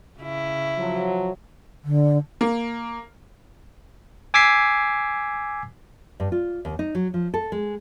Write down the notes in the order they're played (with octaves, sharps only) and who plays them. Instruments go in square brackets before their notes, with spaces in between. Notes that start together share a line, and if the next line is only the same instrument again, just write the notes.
[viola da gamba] C#3 E4
[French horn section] F3 F#3
[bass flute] D3
[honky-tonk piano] A#3
[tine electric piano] G#5 D6 E6 G#6 B6 C7
[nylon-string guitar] G2
F4
D#2
D#4
F#3
F3
A4
G#3